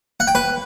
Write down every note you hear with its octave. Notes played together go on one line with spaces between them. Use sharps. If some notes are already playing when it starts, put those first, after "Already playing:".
F#5
G5
B4